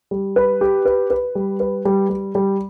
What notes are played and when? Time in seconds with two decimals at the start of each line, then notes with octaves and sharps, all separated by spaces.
0.11 G3
0.36 B4
0.61 G4
0.85 B4
1.10 B4
1.35 G3
1.60 B4
1.85 G3
2.09 G3
2.35 G3